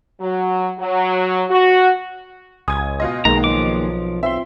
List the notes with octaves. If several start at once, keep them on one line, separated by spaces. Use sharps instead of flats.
F#3
F#3
F#4
C#2 G#5 D#6 G#6
B2 F4 D#5
B1 D#3 G#3 A#3 A#5
F3 D6
C4 F4 E5 C6